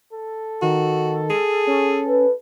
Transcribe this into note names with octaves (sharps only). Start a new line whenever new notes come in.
A4
D#3 F#4
G#4
C#4
B4